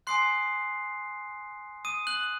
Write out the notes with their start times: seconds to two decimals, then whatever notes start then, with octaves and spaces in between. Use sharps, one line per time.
0.07 G#5 C6 D#6 F#6 C7
1.85 D#6 D#7
2.07 F#6 F#7